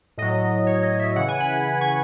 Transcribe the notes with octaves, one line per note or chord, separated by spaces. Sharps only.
A2 F#3 D#5
C#5
D#5
E5
C#3 E3 F#5
G#5
B5
C#6